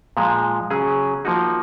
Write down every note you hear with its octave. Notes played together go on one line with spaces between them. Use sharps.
A#2 F3 G#3
C#3 F#3 C#4 G#4
F3 A#3 D#4 F#4